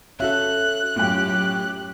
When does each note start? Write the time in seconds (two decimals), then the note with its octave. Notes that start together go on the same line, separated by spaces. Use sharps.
0.20 C#4 F#4 A4 E5 F#6
0.96 F#2 A2 F4 G4 G5